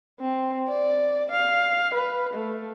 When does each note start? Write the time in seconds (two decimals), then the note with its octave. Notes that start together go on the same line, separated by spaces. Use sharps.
0.20 C4
0.68 D5
1.31 F5
1.94 B4
2.34 A3